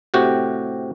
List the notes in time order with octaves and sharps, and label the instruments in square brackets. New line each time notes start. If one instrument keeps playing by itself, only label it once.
[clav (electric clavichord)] A2 C3 F#4 G4